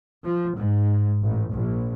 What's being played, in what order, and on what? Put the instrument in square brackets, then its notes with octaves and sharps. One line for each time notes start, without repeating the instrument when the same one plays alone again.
[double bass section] F3
G#2
A1
A#1